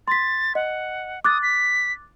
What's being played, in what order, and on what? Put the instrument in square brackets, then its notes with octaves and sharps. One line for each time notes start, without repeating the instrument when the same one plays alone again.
[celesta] C6 B6 [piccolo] A6
[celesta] D#5 [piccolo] F#5
[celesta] D6 F#6 A6 [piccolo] D#6
[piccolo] B6